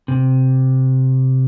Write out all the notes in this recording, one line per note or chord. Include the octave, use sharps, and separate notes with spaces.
C3